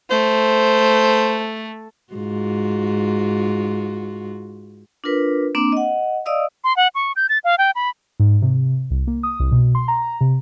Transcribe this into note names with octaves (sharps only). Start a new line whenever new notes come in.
A3 C5
G#2 F4 F#4
D4 F4 A#4 B4
A#3 C4 D4 D6
D#5 F#5
D5 D#5 F5 D#6 E6
C6
F#5
C#6
G6
A6
F5
G5
B5
G#2
C3
C2
A#3
D#6
C2
B2
C6
A#5
C3